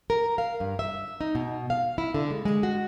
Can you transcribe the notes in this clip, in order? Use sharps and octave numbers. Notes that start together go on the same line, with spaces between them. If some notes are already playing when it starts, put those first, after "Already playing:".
A#4
F5
G2
E5
D#4
B2
F5
E4
D3
G#3
G#3
F#4